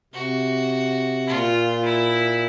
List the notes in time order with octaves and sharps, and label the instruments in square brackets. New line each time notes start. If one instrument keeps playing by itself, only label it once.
[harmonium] C3 [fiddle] F#4
[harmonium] A#2 [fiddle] F4
[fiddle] E4